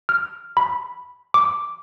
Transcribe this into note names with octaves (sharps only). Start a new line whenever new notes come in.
F6
B5
D6